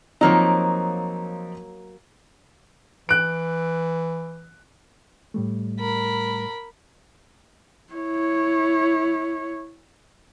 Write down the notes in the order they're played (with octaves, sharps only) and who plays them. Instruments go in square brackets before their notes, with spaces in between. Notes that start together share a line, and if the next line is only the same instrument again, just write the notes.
[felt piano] F3 C4 D#4 [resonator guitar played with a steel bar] F#3 A#3 C#5
[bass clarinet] E3 [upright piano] F#6 D7
[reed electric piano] A2 G3 A3
[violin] A#4 B5
[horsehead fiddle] E4 C#5